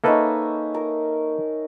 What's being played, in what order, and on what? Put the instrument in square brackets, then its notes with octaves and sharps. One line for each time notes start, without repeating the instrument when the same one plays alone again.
[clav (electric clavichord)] A#3 A4 B4 [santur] C#4 D#4 E5
[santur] A#4